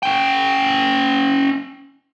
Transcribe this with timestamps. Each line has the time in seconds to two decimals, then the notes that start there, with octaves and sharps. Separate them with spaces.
0.03 C#4 G5